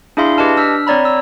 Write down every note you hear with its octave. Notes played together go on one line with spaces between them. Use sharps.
D4 E4 G#4 E5 F5 C6
G4 B4 D#5 A5 F6
D4 E6 F6 B6
C4 C#5 D5 A#5 B5
E6